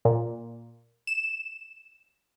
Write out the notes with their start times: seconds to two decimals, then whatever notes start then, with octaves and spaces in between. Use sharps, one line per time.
0.05 A#2
1.07 E7